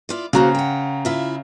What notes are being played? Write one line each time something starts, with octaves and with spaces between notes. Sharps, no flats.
E4 F4 D5
C#3 A#3 F#4 C5 A#5
F#5 G5
E4 F4 E5